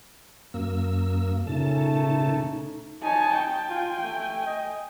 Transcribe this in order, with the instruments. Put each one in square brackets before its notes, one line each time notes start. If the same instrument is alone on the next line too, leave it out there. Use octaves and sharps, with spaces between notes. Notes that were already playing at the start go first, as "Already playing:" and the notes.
[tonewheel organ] F#2 A#3 E6
[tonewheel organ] A#2 C#3 A5 [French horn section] A3 C#4 A4 [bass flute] D#4
[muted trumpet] D#4 [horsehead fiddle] C#5 G#5 [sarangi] A5
[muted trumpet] D#4 [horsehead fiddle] G5
[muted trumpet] F4 [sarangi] G#5
[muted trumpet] A3
D#5